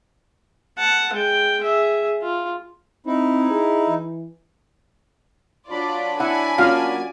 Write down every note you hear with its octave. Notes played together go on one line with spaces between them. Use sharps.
F#5 A5
G#3 G5
G#4 E5
F4
C4 D#4 E4
G#4
E3
F#3 D4 F4 D5 B5
E4 D5 F#5 G#5
A#3 C#4 F4 F#4 F5